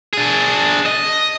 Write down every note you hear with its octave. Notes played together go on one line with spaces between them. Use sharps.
D4 G#4
D#5